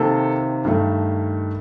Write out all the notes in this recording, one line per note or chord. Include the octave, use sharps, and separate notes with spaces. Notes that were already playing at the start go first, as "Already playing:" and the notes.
Already playing: C3 D#3 A#3 A4
G2 D#3 A3